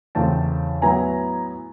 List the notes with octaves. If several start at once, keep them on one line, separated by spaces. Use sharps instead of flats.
E2 C#3 E3 A3 C4 G5 A5
A2 F#3 B3 E4 G#5 A#5